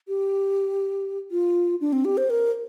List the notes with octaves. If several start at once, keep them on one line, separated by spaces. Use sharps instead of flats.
G4
F4
D4
C4
G4
C5
A#4